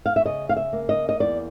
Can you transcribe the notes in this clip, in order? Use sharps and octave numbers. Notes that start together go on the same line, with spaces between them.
F5
E5
C#3 D#5
F5
E5
A#3
D#5
D#5
E2 D5